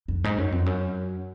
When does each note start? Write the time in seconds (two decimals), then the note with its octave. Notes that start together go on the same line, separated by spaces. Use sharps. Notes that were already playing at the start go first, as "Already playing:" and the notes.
0.08 F2
0.24 G#2
0.38 F#2
0.52 F2
0.66 F#2